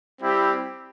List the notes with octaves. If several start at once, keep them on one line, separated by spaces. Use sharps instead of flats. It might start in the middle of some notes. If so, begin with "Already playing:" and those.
G3 C4 E4 G4